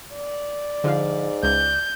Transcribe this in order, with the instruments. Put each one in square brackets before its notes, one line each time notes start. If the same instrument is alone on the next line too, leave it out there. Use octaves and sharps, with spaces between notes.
[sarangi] D5
[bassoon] G#2 [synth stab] D3 F3 F5
[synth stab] C#2 [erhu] G6